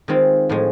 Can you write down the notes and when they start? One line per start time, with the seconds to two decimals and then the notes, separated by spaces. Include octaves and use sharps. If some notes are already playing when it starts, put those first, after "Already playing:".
0.08 D#3 G#3 C4 F4
0.49 A2 F3 G#3